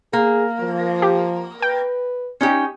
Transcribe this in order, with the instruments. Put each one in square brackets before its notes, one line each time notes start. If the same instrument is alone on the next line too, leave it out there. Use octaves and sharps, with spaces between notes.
[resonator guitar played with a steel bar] A#3 [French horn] G#4
[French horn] F3
[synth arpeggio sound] G4
[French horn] B4 [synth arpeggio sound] G5
[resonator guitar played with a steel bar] C#4 D#4 G4